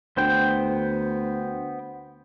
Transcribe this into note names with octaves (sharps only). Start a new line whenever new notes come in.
D2 B3 C5 G5